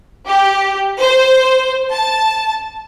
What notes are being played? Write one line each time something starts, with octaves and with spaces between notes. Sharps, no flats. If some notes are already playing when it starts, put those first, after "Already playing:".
G4
C5
A5